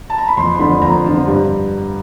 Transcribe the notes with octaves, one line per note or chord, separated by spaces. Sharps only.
A5
A#5
B5
F2 C6
C6
D3 F3 B5
F2 A#5
D3 F3
G2